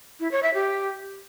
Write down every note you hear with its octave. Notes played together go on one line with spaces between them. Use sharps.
E4
C#5
E5
G4